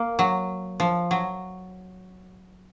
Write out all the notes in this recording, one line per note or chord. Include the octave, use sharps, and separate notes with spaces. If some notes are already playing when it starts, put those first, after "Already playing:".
Already playing: A#3
F#3
F3
F#3